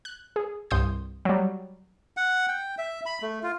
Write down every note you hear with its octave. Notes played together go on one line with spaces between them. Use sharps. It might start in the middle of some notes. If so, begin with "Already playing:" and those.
F#6
G#4
C2 G2 C6 D#6 G6
F#3 G3
F#5
G5
E5
B5
A3
F4